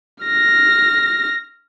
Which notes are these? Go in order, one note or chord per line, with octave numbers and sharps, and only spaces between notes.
F6 A#6